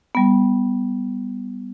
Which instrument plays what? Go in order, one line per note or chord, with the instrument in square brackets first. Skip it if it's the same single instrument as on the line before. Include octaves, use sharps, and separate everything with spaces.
[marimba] G3 B3